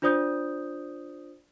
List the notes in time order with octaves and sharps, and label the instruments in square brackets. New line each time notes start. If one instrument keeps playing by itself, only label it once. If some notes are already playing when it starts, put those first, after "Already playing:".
[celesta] D4 F4 C5 D5 D#6 G6